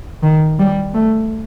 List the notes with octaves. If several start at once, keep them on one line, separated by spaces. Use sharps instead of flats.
D#3
G3
A3